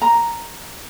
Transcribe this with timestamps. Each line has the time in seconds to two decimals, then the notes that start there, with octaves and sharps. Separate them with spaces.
0.02 A#5